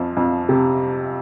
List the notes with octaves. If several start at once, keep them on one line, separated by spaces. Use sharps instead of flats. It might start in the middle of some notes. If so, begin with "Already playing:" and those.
Already playing: F2 F3
F2
C3